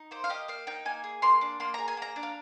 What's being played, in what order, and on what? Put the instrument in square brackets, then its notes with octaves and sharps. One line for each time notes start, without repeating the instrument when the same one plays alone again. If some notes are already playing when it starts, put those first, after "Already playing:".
Already playing: [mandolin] D#4
A#3 C5
F5
G4 D#5
A#3 F5
D#4 G5
A#3 G#5
G#4
A#3 C6
D4
A#3 C6
G#4 A#5
G#5
A#3 A#5
D4
F5